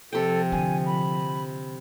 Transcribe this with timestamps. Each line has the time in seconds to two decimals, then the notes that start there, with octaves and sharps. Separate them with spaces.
0.13 C3 F3 A4 G5
0.52 D3 G#5
0.86 B5